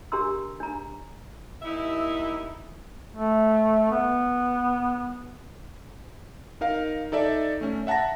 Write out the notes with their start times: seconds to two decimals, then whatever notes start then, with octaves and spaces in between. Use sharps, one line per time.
0.12 D4 G4 A#4 A#5 C6 E6
0.60 D4 A#5
1.62 D#2 D#4 E4 E5
3.16 A3
3.92 B3
6.61 D#4 A#4 F5
7.12 D#4 A4 D5 E5
7.61 A3 C#4
7.87 E5 F#5 A5 A#5 A#6